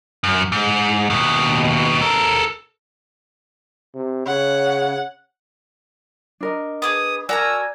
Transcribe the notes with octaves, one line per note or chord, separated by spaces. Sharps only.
F#2
G#2
D#2 B2
A4 A#4
C3
C#3 C#5 F#5
D4 A#4 D#5
B3 G#4 D6 D#6
F#4 A#4 D5 G#5 A#5 E6